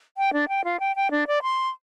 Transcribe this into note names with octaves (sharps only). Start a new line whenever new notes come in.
G5
D4
G5
F4
G5
G5
D4
D5
C6